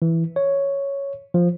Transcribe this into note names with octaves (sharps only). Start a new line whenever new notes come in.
E3
C#5
F3